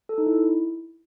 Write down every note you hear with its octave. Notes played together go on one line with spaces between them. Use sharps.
A4
D#4
E4